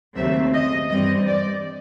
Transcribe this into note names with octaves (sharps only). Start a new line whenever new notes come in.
D#2 C#3 F#3 A3 C4 E5
D#5
G2 E3 G3 C4 D#5
D5